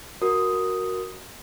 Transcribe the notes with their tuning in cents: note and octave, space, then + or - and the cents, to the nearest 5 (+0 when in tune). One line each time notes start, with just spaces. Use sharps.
F#4 +0 A#4 +0 D#6 +0